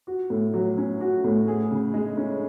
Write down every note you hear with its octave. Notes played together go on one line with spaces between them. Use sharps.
F#4
A2
F#3
C#4
F#4
A2
G#4
C#3
G#3
C#4